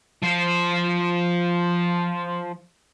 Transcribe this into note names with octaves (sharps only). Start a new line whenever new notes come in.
F3 C5